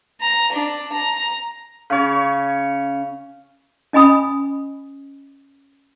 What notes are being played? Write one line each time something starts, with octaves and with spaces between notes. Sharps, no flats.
A#5
D4
A#5
C#3 C#5
C#4 D#5 G#5 B5 D#6